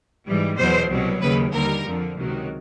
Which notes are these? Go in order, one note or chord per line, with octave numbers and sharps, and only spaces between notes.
G#2 E3 G3
E2 B2 F#3 C5
C2 B2 F#3
D#2 C#3 F#3 B4
D#2 D3 G3 A#4
F2 D3 F3
C#2 C3 D#3 F#3